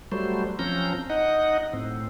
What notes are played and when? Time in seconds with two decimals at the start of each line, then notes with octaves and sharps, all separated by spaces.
0.12 F#3 G3 A3 C5
0.59 F3 C4 C#4 A#5 G6
1.10 D#4 D#5 F#5
1.73 A2 C4